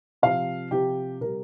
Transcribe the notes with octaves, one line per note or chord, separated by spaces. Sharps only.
C3 F3 F5
C3 F3 G4
C3 G3 A#4